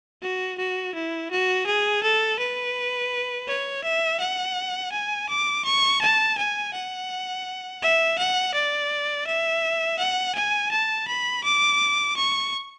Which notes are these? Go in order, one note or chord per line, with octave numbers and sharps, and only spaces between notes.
F#4
F#4
E4
F#4
G#4
A4
B4
C#5
E5
F#5
G#5
D6
C#6
A5
G#5
F#5
E5
F#5
D5
E5
F#5
G#5
A5
B5
D6
C#6